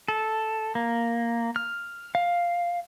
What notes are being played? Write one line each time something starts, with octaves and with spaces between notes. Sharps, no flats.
A4
A#3
F6
F5